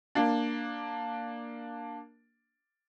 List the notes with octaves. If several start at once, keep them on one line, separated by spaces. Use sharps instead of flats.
A#3 D4